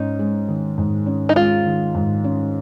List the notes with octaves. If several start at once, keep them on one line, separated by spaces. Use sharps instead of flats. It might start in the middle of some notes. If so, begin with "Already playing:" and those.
Already playing: G#2 C#4 D#4
G#3
D#3
G#2
C#4
D#4
G#3 F4
D#3
G#2
C#4